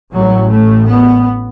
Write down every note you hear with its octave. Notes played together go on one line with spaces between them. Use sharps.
A1 A2 F#3
A3
B3